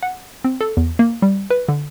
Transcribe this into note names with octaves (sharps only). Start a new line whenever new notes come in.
F#5
C4
A4
E2
A#3
G3
B4
D3